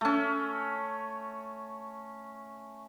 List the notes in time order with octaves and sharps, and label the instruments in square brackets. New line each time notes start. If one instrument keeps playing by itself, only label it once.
[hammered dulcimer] A3 C#4